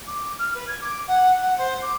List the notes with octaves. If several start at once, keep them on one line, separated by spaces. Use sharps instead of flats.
D6
F6
B4
G#6
D6
F#5
F#5
C5
D6